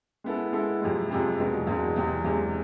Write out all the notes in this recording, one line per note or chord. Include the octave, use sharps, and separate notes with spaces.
G#3 B3 E4 A4
G#3 B3 E4 A4
F2 C3 G#3
F2 C3 G#3
E2 B2 G#3
E2 B2 G#3
E2 C3 G#3
E2 C3 G#3